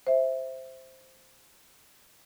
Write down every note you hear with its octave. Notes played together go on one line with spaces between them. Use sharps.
C5 E5